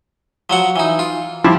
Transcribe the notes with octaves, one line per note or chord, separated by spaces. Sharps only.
F3 F#3 F#5
E3 D#4
F4
F3 E4 G4